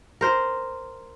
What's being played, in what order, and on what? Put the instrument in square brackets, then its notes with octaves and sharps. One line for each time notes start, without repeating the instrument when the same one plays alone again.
[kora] A#4 C5